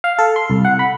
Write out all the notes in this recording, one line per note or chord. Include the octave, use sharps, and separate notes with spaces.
F5
A4
C6
C2
F#5
B5